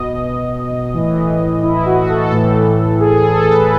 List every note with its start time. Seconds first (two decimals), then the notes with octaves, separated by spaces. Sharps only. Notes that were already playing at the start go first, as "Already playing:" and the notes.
Already playing: B2 D#5
0.94 A2 E3
1.63 E4
1.86 F#4
2.09 A4
2.32 A2 E3
3.00 G#4
3.17 G#4
3.34 A4
3.51 B4